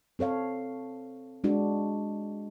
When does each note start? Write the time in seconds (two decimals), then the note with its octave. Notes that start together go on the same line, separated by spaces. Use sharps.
0.19 C4 A4 C#5 F5
1.44 G#3 D4 F#4